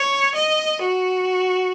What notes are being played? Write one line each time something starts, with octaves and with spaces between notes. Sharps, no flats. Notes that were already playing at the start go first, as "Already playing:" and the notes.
Already playing: C#5
D#5
F#4